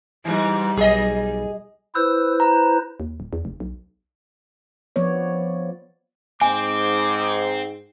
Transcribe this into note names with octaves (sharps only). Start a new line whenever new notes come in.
G#2 E3 G3
B1 G#4 D#5
E4 B4 C5 E6
A#5
D#2
D#1
E2
F1
B1
F3 B3 C#5 D5
G#2 C4 G#5 D6